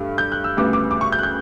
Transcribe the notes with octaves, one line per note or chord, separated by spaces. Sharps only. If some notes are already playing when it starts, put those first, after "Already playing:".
Already playing: G2 A3
G6
F#6
E6
D2 C#3 G3 B3 D6
D6
D6
C#6
G6
F#6
G6